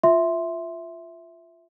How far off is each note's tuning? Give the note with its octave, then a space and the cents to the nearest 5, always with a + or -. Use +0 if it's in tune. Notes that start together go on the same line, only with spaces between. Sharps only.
F4 +0 E5 +0 C6 +0